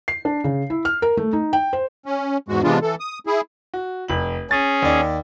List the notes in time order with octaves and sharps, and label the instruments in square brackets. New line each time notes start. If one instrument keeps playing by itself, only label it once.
[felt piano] C7
D4
C#3
E4
F6
A#4
A3
D#4
G5
C5
[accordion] C#4
E2 G#2 G#3 F#4
C3 E3 G#3 B3 D4 F4
E3 A4
D#6
E4 G#4
[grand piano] F#4
F1 F#7
[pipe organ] C#4 G#4 [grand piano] A6
[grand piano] D#2 D5